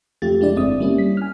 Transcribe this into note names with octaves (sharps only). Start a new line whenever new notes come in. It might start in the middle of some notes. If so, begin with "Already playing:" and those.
F2 A3 F4 G4 A6
G#3 D4 E4 D5
G1 C4 E5 D#6
G3 A#3 C#4 E4
B6
G#5 F6